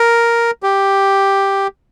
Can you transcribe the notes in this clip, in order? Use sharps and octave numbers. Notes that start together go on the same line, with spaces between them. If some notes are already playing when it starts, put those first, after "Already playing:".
Already playing: A#4
G4